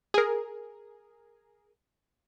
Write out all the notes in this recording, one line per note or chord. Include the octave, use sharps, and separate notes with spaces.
G#4 A#4